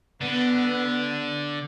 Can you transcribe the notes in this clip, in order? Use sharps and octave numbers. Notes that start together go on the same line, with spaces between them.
D3 B3